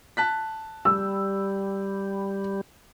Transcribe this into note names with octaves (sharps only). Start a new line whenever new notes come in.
A5 F#6 B6
G3 E6